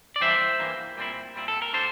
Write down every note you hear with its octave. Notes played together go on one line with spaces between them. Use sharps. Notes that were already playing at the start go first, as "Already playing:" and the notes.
D5
G2 E3 G3 A#3 C5 E5
G2 E3 G3 A#3
A#2 G3 C4 E4
A#2 G3 C4 E4
A4
A#4
A2 G3 D4 A4 C5